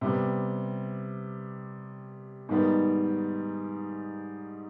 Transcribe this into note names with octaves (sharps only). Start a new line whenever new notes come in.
C3 G3 B3
G#2 D#3 G3 B3